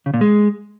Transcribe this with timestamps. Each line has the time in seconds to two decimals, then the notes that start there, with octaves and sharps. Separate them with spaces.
0.06 C#3
0.14 A#2
0.21 G#3